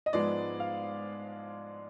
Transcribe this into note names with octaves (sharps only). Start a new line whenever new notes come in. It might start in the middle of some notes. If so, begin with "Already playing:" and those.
D#5
G#2 F3 G#3 B3 D5
F5